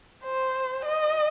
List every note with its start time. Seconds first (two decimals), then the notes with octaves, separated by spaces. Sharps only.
0.24 C5
0.85 D#5